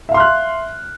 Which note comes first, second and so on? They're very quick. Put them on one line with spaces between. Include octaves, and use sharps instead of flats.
E5 F5 C6 F6 F#6